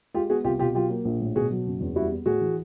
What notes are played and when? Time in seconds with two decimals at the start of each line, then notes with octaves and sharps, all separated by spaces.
0.14 G#3 F4 G4
0.30 B3 F#4 G#4
0.44 C2 F4 G4
0.59 B2 F4 G4
0.74 F#3 F4 G4
0.90 A#3
1.05 A#1
1.20 A2
1.36 B2 F#4 G#4
1.51 F#3
1.66 F#1
1.80 E2
1.95 G3 E4 F#4
2.11 B3
2.26 A2 F#4 G#4
2.41 E3